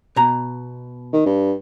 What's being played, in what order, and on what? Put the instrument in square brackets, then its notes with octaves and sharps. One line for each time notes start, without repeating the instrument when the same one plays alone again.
[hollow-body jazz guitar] B2 A#5
[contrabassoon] D#3
G2